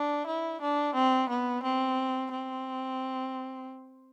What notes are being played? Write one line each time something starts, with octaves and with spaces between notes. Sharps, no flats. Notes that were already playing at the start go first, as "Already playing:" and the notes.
Already playing: D4
E4
D4
C4
B3
C4
C4